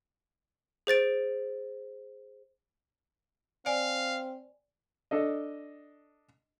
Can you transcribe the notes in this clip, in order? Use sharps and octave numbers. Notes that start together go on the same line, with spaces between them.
G#4 C5 A6 D7
C4 D5 F5 G#5
D4 A4 D#5